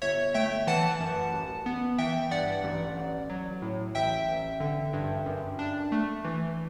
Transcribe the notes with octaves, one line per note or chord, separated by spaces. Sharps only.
G1 C#5 E5
A3 E5 G5
E3 F#5 A5
F#2
A1
B3
E3 E5 G5
G2 D5 F#5
A1
A1
F#3
A2
A1 E5 G5
A1
D3
G2
F#2
D4
A3
E3